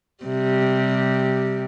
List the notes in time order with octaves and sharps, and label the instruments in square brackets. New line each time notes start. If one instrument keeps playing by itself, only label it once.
[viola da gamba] C3 G3